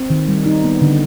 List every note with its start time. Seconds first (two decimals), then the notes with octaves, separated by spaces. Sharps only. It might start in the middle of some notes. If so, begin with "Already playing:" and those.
Already playing: C4
0.10 D#3
0.28 G3
0.46 D#4
0.64 B3
0.81 D3